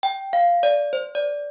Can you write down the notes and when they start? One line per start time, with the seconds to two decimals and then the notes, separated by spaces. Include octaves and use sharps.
0.03 G5
0.33 F5
0.63 D5
0.93 C5
1.15 D5